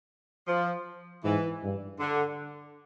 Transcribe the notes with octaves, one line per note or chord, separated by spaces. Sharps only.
F3
G#2 E3
G2
D3